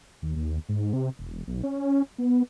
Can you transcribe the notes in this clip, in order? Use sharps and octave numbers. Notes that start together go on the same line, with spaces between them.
D#2
D#2
G#2
C3
E1
B1
C#4
B3